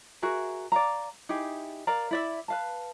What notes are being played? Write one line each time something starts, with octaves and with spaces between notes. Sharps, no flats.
F#4 G#4 A#4 E5
D5 F5 A#5
D#4 E4 G4 G#4
A#4 D5 F5 A#5
E4 D5 E5
B4 F5 A5